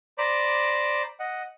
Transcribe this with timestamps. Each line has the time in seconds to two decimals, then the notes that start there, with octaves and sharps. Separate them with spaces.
0.18 C5 D5 A#5 B5 D6
1.20 D#5 F#5